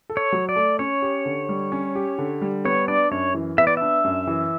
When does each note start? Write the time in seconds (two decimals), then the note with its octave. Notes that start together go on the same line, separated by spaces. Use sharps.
0.10 A4
0.17 C#5
0.32 F#3
0.49 D5
0.56 A3
0.79 C#4 C#5
1.02 G4
1.26 D3
1.49 G3
1.72 C#4
1.95 G4
2.18 D3
2.41 G3
2.65 B3 C#5
2.88 D4 D5
3.11 F#2 C#5
3.34 E3
3.58 B3 E5
3.67 D5
3.77 D4 E5
4.04 F#2
4.27 E3